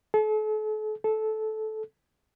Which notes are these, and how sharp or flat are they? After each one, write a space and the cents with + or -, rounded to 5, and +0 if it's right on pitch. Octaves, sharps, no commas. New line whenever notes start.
A4 -40
A4 -15